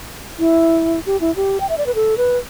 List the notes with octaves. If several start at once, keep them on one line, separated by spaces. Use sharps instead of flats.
E4
G4
E4
G4
G5
E5
D5
B4
A4
B4